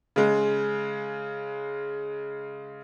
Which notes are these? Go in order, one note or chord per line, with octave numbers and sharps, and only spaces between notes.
C#3 G#3